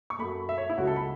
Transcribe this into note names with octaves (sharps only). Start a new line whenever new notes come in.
C#6
F#2 F#3 A3 B5
E5
C#5
E4
C#2 C#3 F#3 A3 F#4
A4
B5